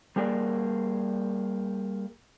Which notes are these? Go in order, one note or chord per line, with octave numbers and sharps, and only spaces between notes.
G3 A#3 G#4 A#4 D5